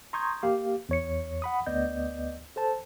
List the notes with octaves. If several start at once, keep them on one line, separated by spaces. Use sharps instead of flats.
A#5 C6 C#6 D#6 G6 G#6
A#3 G4 F5
E2 C#5 C#7
F#5 B5 D#6
D2 B3 D5 D#5 G6
A4 C5 A5